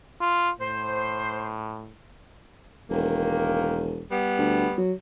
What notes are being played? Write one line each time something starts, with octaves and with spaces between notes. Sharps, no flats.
F4
A2 C5
E1 D#3 A#3
G3 B3
D2
F#3